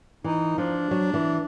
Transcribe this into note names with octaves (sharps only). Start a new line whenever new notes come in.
E3 D#4
F3 D4
F#3
E3